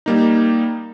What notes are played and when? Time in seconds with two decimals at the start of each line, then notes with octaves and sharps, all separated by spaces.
0.06 G3 A#3 D#4